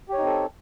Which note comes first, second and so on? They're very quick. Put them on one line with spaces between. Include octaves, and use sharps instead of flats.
G4 C#5 D#4 C4 A4